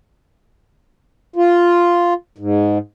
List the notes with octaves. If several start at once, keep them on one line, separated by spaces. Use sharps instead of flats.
F4
G#2